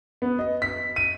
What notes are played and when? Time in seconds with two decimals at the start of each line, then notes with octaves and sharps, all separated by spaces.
0.22 B3
0.38 D#5
0.62 B6
0.96 D#7